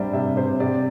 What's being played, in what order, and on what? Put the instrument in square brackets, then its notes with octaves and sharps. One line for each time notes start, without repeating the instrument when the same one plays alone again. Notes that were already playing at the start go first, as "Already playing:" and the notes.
Already playing: [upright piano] C3 G3 D4 C5 D5 E5
C3 E5
C3 C5
C3 D5